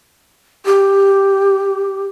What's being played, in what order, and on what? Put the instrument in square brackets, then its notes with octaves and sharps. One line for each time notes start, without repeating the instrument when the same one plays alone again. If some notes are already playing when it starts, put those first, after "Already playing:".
[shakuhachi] G4